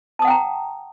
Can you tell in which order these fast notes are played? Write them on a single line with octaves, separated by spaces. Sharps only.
A5 D#6 F#5 G5 A#5